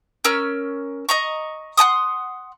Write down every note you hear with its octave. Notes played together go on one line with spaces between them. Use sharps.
C#4 A#4 E6 F6
D#5 A#5 C#6
F#5 G#5 C6 D#6